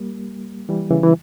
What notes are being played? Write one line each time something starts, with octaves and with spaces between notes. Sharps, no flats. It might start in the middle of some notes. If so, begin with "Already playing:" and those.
Already playing: G3 A#3
E3 G3
C#3 E3
E3